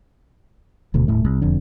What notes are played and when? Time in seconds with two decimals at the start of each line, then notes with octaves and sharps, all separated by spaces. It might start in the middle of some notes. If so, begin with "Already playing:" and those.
0.94 D#1 D2 B2
1.08 D#1 A2 A3
1.25 C2
1.41 E1 F2 D3